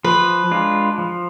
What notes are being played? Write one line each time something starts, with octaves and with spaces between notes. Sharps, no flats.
F3 B4
G#3 D4 F4
F3